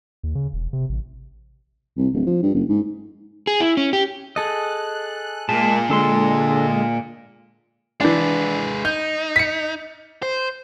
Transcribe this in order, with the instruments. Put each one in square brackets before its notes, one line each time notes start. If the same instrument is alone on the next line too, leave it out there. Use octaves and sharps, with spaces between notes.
[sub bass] D#2
C#3
E1
C3
A1
[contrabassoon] C2
D1
F3
G2
F#1
G#2
[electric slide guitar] G#4
E4
C#4
G4
[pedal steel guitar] G#4 A4 D#5 [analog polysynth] F#6
[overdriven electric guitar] A#2 [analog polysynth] G#3 A#3 [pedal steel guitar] A5
[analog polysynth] D3 G#3 [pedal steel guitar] D4 A4 C6
[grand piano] E3 D4 [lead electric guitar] G#3 B4
[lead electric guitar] D#4 [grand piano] G6
[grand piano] B6 C#7
[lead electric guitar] C5